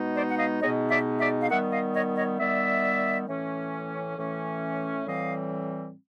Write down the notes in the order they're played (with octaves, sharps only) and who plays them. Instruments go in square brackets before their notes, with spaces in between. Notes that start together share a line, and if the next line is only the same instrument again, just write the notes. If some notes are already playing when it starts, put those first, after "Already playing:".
Already playing: [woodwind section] B2 G#3 B3 D#4
C5 D5
F#5
D#5 F5
B2 G#3 B3 D#4 C#5 D#5
D5 E5
D5 E5
F5
D#3 G3 B3 E5 F#5
D#5 F5
C#5 D#5
C#5 D#5
D#3 G3 B3 D5 E5
A2 E3 A3 C#4
A2 E3 A3 C#4
A2 E3 G3 C4 D#5 F5